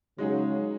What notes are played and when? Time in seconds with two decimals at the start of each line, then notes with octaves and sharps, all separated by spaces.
0.18 C#3 F#3 G#3 D#4 G#4